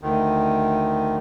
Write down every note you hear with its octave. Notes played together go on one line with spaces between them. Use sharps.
D2 D#3